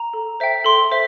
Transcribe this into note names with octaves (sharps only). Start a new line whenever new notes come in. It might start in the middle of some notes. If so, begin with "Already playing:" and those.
Already playing: A#5
A4
C5 E5 G5
A4 C6
C5 E5